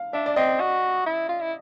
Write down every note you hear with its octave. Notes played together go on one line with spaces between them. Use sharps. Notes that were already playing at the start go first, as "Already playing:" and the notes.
Already playing: F5
D4 E5
D5
C4 D#5
F#4
E4
F4
E4